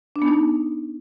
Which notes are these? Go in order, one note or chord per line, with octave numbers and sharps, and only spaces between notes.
D4
B3
D#4